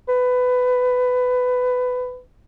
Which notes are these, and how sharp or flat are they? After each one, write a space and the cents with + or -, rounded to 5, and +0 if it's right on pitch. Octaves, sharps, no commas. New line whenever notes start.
B4 +20